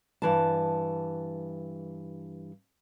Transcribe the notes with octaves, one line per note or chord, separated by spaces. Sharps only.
G2 E3 A5